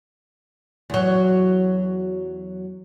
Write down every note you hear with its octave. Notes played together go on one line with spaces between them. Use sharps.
E2 F#3